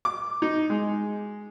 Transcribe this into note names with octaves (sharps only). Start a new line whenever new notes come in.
D6
D#4
G#3